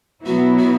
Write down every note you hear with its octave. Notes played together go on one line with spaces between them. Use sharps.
B2 F#3 B3 E4 F#4
F#4